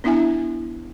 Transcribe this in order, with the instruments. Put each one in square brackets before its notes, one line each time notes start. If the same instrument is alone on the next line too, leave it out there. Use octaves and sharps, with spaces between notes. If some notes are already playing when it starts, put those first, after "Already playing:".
[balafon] B3 D4 E4 E5 G#5